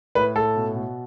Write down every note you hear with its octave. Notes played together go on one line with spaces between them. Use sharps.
A2 B4
A2 A4
B2
B2